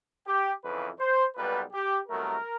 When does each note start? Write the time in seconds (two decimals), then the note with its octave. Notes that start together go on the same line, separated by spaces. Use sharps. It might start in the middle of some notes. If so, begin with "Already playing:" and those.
0.26 G4
0.63 F2 C#3 E3 B4
0.99 C5
1.35 B1 A#2 G3 B3 B4
1.72 G4
2.08 C2 B2 F#3 A3 A#4